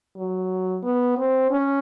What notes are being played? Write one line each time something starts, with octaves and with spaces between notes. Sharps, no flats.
F#3
B3
C4
C#4